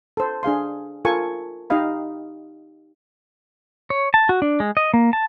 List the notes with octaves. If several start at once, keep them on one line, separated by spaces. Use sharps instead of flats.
A4 C5
D4 G#4 F5 C6
F4 A4 A#4 G#5 C#6
D#4 G4 D#5 F5 B5
C#5
A5
F#4
D4
G#3
D#5
A#3
A5